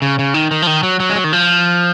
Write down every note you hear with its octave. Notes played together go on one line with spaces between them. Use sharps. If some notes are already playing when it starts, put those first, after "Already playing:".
C#3
C#3
D#3
D#3
F3
D#3
F#3
F#3
G#3
F#3
D#3
F3